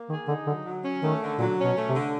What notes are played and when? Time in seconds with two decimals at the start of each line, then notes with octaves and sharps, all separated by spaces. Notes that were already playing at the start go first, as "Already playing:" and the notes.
Already playing: A#3
0.09 D#3 G#4
0.28 D3 D#4
0.47 D3 F#3
0.65 F#3
0.84 C#4
1.02 D#3 A3
1.21 D3
1.39 A#2 F#3
1.58 C#4
1.64 B2
1.76 A3
1.89 C3
1.94 D3